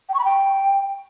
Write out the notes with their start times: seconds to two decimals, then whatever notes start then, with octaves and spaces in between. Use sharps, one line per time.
0.09 G5
0.14 C#6
0.19 B5
0.24 G5